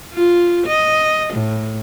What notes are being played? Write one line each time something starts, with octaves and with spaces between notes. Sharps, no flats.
F4
D#5
A2